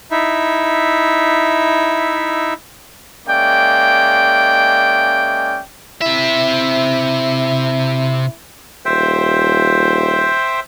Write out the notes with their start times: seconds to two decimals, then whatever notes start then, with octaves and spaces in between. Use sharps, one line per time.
0.11 D#4 E4 E5
3.28 G#3 A#3 C#4 D5 E5 G5
6.02 C3 E4 E5
8.85 D#1 C5 E5 G5